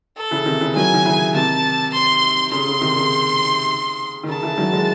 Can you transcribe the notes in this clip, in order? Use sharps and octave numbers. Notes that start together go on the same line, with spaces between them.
A4
C#3 E3
C3 D#3
C#3 E3
D#3 F#3 G#5
D#3
C#3 E3
C3 D#3 A5
C6
C#3 C6
C#3
C3 D#3
C#3
D#3
C#3 A5
C#3 E3
D#3 F#3
E3 G#3